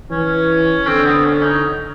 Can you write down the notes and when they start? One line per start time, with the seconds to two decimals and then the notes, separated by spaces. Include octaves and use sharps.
0.10 E3 C#4
0.87 D3 C4
1.05 B3
1.25 C#4
1.43 D#4